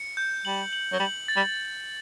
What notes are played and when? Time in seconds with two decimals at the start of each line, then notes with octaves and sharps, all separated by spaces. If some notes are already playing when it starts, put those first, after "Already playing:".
Already playing: C#7
0.17 G6
0.45 G3 F#7
0.73 F#7
0.93 F#3
1.00 G3 F#7
1.28 A6
1.36 G3